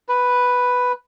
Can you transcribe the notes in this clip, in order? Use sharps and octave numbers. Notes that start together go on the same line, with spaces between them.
B4